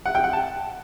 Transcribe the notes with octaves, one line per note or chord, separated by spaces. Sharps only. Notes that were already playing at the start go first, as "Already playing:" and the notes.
F#5
G5
F#5
A5